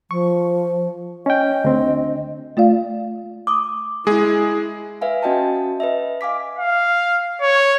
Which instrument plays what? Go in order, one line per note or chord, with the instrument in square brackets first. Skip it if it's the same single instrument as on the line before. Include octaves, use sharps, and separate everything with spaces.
[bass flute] F3 [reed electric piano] C#6
[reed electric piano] C#4 G5 [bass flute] D#5
[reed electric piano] D2 C4
[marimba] A3 F4 D5 F5
[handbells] D6 D#6
[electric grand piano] G#3 G#4 [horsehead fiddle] E4
[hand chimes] B4 E5 F5 G#5
C#4 F#4 D#5 G5 A5
B4 D#5 E5
F5 G#5 D6 B6
[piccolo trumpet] F5
C#5